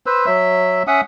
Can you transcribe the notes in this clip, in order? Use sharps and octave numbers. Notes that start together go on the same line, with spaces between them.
B4 C5 E6
F#3 E5 E6
C#4 E5 F#5 D#6